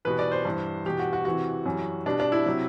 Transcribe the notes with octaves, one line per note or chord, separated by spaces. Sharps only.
E2 B2 G3 B4
D5
C5
G2 E3 G3
E2 B2 G3 G4
F#4
F#4
E2 C3 E3 F#4
F#2 E3 G3
B2 G3 D4
D4
E4
C3 F#3